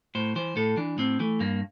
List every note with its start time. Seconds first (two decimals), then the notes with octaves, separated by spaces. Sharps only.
0.15 A2 C5
0.36 E3 C5
0.56 A2 A4
0.77 E3 D4
0.98 A2 C4
1.20 E3 A3
1.40 G2 A#3